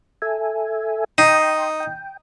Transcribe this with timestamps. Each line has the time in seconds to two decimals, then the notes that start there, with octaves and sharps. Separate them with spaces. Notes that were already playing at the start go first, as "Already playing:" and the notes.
0.22 A4 E5 G#5
1.18 D#4 G5 C6 D#6
1.80 G5